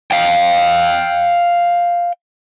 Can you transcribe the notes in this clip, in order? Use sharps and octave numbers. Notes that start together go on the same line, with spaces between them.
F5 G5